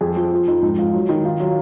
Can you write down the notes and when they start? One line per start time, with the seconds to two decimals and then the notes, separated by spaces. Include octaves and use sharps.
0.01 F2 G#4
0.16 F3
0.32 F3
0.47 F2 D#4
0.62 G#2 D#4
0.78 G#2 F4
0.93 F#3 D#4
1.09 D#3 D#4
1.25 D#3 F4
1.40 F#3 F4